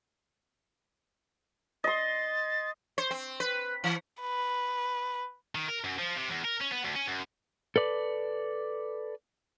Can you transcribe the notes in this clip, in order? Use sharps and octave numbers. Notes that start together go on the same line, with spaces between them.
D#5 C6 A6
C5
C4
B4
E3
B4
D#3
A#4
F#2
F3
C3
E2
A#4
C#4
B3
D2
C#4
F#2
A4 B4 D5